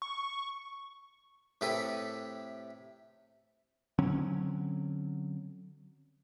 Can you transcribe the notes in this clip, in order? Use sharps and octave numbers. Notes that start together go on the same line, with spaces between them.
C#6
A2 C3 G4 A4 B4 D#6
D3 F#3 C4 C#4